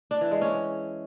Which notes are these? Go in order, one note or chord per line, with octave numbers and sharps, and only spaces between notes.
D4
E3
G#3
C#4